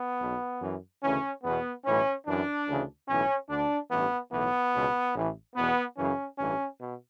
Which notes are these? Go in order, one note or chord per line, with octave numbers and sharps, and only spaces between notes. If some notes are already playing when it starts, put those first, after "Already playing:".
Already playing: B3
B1 B2
F#2 E3
D2 C#3 E3 C#4
E2 B2 B3
B1 A2 E3 C#4
F#2 E3 D4
D2 C#3 E3
B1 A2 E3 C#4
D2 D3 D4
A1 G2 E3 B3
B1 A2 E3 B3
C#2 B2
A1 A2 E3
E2 B2 B3
F#2 C#3 E3 C#4
A1 G2 E3 C#4
B2